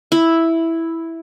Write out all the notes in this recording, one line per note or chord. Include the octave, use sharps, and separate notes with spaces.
E4